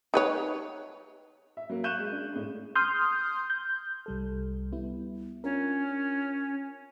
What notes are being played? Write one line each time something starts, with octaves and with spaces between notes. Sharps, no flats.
D#4 B4 C#5
E5
F#3 A#3
F5 C#6 F#6 G6 D#7 E7
G#3
D4
A2 G#3
C6 D#6 F6 G6
G6
C2 G3 A4
G3 B3 E4
C#4 D4 F4 A#4